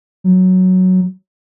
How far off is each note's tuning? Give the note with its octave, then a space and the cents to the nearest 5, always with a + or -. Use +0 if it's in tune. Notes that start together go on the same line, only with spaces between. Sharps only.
F#3 +0